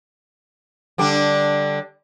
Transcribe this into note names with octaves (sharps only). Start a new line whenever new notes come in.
D3 G3 D4